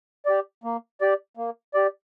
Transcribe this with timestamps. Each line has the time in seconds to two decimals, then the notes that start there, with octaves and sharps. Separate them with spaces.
0.26 G4 D5
0.64 A#3
1.01 G4 D5
1.37 A#3
1.74 G4 D5